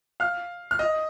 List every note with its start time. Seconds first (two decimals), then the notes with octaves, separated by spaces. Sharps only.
0.20 F5 F6
0.71 F6
0.79 D#5 D#6